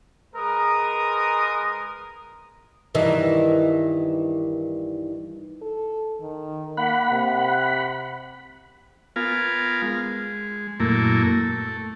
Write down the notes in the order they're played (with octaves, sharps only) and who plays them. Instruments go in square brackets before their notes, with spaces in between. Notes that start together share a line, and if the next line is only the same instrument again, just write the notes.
[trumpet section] G#3 G#4 A#4 B4 D#6
[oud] G2 D#3 E3
[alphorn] A4
D#3
[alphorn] A#3 [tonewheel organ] F#5 B5
[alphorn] C3
[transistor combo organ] B3 F4 A#4 F5 G#5
G#3
F#2 A#2 A3 A#3 E4
A3